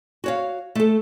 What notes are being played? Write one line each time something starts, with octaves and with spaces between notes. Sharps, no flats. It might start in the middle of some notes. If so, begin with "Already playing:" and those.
F#4 C#5 F5
A3 A4